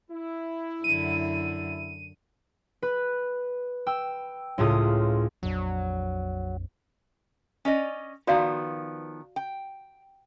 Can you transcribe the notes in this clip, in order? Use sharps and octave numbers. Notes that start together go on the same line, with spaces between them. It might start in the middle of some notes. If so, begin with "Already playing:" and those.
E4
F#2 D3 D#7
B4
G5 E6
C#2 A2 F4 D#6
A#1 F2 F#3 D4
C#4 D5 D#5
D#3 F3 B3 F#4 D5 F5
G5